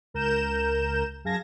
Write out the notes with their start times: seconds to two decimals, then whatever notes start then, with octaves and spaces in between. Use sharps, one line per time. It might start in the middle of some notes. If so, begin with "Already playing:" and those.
0.14 C#2 A#4 A#5 G6 E7
1.24 F#2 G#4 F5 A5 G#6 A#6